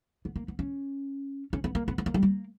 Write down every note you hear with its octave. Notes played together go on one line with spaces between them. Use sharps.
B3
A#3
B3
C#4
C#4
B3
A#3
B3
B3
A#3
G3
A#3